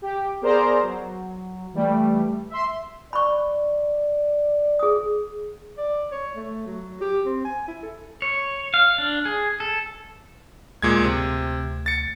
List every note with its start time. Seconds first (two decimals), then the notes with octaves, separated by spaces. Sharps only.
0.02 G4
0.41 B3 G#4 A#4 C5 D5 A#5
0.82 F#3
1.74 E3 G3 A3
2.50 E5 C6
3.13 D5 B5 C#6
4.79 G#4 D#6
5.78 D5
6.12 C#5
6.36 A3
6.66 F#3
7.01 G4
7.26 C4
7.45 G#5
7.68 E4
7.83 A4
8.22 C#5
8.74 F5
8.98 D4
9.25 G#4
9.60 A4
10.82 D2 A#2 G#3 G#6
11.04 C3
11.86 A6 C#7